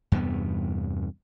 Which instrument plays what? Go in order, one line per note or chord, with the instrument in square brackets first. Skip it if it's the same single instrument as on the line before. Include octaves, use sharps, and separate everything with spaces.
[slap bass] E2 G2 C3 B3